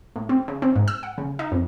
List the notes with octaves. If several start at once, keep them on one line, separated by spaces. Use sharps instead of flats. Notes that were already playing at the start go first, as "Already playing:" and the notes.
A2
C4
C#3
C4
G#2
E6
F#5
C#3
D#4
F2